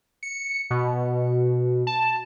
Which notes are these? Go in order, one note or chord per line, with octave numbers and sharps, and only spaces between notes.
C#7
B2
A5